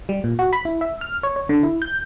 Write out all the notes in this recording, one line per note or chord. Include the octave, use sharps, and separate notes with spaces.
G3
A#2
F#4
B5
E4
E5
F6
C#5
C#5
D3
E4
G6